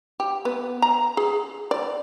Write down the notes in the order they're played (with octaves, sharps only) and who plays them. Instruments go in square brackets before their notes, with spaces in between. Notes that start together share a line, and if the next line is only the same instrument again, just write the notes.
[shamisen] G4
B3
A#5
G#4
D5